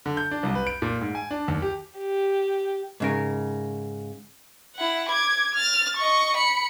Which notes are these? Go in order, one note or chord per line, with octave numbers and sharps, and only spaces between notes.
D3
G6
D4
C2
B4
D7
A#2
G#2
G#5
D4
D#2
G4
G4
G#2 C#3 A#4
E4 F#5
D6 G#6
F6 A6
D#5 C#6
B5 C#7